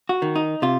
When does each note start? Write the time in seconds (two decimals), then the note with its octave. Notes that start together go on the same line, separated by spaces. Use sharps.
0.09 F#4
0.22 D#3
0.36 D#4
0.62 C3 F4